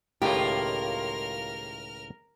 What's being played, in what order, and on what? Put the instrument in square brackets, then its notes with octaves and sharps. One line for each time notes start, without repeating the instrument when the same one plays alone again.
[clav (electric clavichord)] C#2 A2 D#3 [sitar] A#3 F4 [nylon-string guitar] G4 [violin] A#4 F6